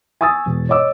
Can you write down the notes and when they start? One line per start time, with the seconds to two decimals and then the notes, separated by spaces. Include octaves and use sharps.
0.21 G#5 C#6 D#6 E6 A6
0.46 E1
0.69 C#5 D#5 D6 E6